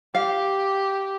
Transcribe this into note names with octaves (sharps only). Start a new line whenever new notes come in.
G4 F5